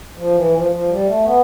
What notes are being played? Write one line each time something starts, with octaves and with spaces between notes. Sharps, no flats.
F3
E3
F3
F3
G3
A3
B3